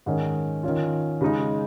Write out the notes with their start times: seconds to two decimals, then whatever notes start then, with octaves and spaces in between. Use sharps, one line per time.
0.06 G#2 D#3 C#4
0.63 D#3 C#4 F4
1.21 C#3 G#3 D#4